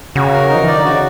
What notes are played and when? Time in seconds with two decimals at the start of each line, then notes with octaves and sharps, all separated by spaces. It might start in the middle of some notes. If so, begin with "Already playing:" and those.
0.15 C#3 F#4
0.33 A#4
0.50 D#4
0.55 F3
0.63 E3
0.68 D#3 D5
0.77 D3
0.85 C#3 F#4